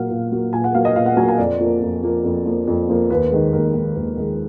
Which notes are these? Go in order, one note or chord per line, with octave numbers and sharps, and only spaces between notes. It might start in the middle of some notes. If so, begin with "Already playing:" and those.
Already playing: A#2 F#3 A#3 F5 F#5
A#2
F#3 A#3
A#2 G#5
F#5
F#3 A#3 F5
D#5
A#2 F5
F#5
F#3 A#3 G#5
G#5
F2 D5
F3 A#3
F2
F3 A#3
F2
F3 A#3
F2
F3 A#3
D#2 B4
D#3 G#3
D#2 A#4
D#3 G#3
D#2
D#3 G#3